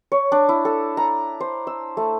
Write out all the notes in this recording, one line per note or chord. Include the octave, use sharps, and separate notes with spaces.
C#5
D4
E4
A4
A#5
C5
E6
A3